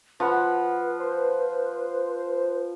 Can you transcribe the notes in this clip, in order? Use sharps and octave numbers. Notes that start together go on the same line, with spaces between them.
F3 B4 F#5 B5
C5